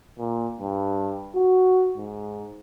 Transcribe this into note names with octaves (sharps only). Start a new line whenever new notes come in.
A#2
G2
F#4
G#2